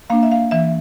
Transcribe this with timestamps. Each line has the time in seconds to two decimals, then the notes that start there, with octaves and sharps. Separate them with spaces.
0.10 A#3 D4 F5
0.23 E5
0.31 F5
0.51 E3 E5